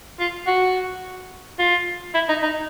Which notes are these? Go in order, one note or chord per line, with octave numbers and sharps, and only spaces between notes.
F4
F#4
F4
E4
D#4
D#4